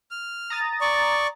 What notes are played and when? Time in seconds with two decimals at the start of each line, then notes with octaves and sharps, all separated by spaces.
0.11 F6
0.50 A#5 D#6 A6
0.81 D5 C#6